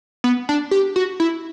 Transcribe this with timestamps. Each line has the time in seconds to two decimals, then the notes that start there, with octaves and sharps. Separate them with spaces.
0.24 B3
0.49 D4
0.71 G4
0.96 F#4
1.20 E4